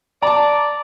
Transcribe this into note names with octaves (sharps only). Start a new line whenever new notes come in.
D5 A5 A#5